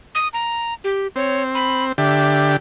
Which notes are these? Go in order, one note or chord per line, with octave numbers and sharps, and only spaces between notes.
D#6
A#5
G4
C4 C#5
B5
D3 G4 E5